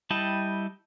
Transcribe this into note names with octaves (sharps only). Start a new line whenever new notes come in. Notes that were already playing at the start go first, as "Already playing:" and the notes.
G3 E4 D#5 G5 A5